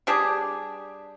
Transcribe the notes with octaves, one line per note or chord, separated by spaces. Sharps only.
G3 D4 G4 G#4